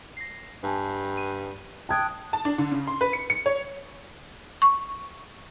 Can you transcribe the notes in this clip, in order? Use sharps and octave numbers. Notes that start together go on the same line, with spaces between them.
A#6 C7
G2 G#5 A5
D#7
G5 A5 D#6 F#6 G#6
A5
D4
D3
C#3
C6
B4
C#7
C#7
C#5
C#6